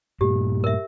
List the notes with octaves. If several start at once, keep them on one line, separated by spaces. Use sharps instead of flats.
G2 A#2 G4
A#4 E5